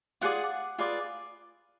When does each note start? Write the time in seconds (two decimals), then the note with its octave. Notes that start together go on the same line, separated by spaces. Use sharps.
0.21 F4 G#4 D5 F#5
0.79 F4 G#4 B4 D5